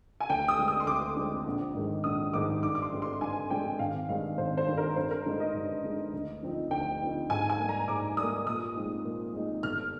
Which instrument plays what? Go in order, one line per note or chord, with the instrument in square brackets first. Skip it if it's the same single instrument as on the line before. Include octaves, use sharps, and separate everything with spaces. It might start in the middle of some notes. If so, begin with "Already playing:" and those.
[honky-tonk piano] G#5
[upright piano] D2 [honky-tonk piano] G5
[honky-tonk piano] D#6
[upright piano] D3 G#3 C4
[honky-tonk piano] D#6
C6
[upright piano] D2 [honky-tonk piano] D6
[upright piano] D3 G#3 C4
A#1
G#2 D#3 G#3 D#4
[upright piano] A#1 [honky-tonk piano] D#6
[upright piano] G#2 D#3 G#3 D#4 [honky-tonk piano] D6
[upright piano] G2 [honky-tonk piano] D6
[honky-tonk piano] D6
C6
[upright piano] D3 G#3 C4
[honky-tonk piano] C6
[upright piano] G2 [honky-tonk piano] G#5
[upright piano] D3 G#3 C4 [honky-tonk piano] G5
[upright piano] G#1 [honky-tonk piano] F5
[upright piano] G2 D#3 G#3 C4 [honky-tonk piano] F5
[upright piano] G#1 [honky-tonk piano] C5
[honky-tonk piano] C5
[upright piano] G2 D#3 G#3 C4
[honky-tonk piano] A#4
[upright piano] G2 [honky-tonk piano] C5
[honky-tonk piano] A#4
[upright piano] D3 G#3 D#4
[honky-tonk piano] D#5
[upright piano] G2
D3 G#3 D#4
D2
D3 F3 C4 D#4
[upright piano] D2 [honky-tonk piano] G5
[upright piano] D3 F3 C4 D#4
[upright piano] G#2 [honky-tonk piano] G#5
[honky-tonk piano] G#5
[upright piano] A#3
G3
[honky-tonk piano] A#5
[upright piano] G#2 [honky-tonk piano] D6
[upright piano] G3 A#3 [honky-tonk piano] D#6
[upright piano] A#2 [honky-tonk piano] D#6
[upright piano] G#3 C4 D#4
A#2
G#3 C4 D#4
[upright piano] G1 [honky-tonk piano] F6